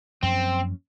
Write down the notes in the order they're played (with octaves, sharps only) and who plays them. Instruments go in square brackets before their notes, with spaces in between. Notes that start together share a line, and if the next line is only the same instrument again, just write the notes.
[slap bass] F#2 F3 A#3 C#4 [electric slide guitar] C4